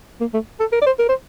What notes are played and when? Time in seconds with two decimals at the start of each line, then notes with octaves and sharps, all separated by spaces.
0.21 A#3
0.34 A3
0.60 A4
0.72 A#4
0.82 D5
0.86 C5
0.99 A#4
1.09 C5